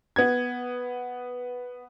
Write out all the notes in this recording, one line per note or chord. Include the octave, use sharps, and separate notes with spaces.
B3 G#6